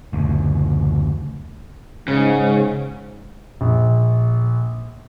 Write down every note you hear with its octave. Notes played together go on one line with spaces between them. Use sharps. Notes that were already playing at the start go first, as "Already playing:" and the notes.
F#1 D2
G#2 C#3
A#1